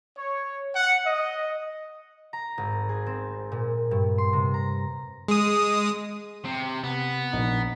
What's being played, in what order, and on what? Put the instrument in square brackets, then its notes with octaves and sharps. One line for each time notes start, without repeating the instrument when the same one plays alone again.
[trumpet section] C#5
F#5
D#5
[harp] A#5
G#1
G#4
C4
A#2
G2
C6
C3
A#5
[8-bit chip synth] G#3 D#6
[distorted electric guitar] C3
[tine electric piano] C3 [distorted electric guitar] B3
[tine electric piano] A#1 D#4